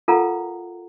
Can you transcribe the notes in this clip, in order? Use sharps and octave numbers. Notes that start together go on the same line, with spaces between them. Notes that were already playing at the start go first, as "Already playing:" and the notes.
F4 A4 A#4 F5 F#5 A#5